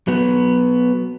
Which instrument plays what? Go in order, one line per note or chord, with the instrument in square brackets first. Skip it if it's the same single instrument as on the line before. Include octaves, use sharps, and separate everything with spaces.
[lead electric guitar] F#3 B3